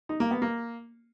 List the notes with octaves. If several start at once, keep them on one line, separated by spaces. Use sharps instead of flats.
D#4
A#3
B3
A#3